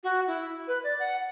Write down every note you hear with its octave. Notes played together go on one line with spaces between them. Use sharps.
F#4
E4
B4
D5
F#5